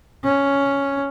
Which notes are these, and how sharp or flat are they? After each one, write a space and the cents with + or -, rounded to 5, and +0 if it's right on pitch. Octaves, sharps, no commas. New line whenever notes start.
C#4 +5